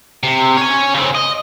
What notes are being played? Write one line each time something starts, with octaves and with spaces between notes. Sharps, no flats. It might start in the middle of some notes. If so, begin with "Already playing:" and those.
C3
C#5 G#5
C#3 C4
D#5